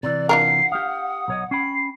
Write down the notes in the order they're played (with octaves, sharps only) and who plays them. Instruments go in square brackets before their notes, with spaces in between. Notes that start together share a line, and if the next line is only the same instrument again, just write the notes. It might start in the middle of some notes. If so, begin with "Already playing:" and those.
[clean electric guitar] C3 E3 [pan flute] D5 [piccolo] A6
[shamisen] D4 F4 A#4 [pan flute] F#5 [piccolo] C7
[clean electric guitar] G4 F5 [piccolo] D#6
[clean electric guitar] B1 C#5 D#5
[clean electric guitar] C#4 G5 B5 [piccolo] C7